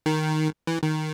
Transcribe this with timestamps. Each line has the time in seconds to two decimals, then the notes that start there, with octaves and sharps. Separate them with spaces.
0.06 D#3
0.67 E3
0.83 D#3